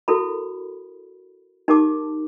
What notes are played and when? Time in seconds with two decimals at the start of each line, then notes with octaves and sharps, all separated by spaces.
0.08 E4 F#4 A4 A#4 B5
1.68 D#4 G4 A#4 A5 D6